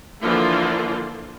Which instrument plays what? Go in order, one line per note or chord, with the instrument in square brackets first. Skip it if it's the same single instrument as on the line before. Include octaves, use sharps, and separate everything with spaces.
[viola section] D3 E3 F3 A#3 F4